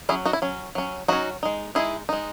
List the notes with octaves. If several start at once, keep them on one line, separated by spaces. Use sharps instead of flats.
F#3 C#4 E4 G#4
D#4 F#4
E4
F#3 C#4
F#3 C#4
F#3 C#4 D#4 F#4
G#3 D#4
G#3 D#4 E4 G#4
G#3 D#4